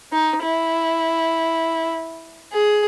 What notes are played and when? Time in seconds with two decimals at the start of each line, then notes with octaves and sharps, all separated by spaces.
0.13 D#4
0.43 E4
2.53 G#4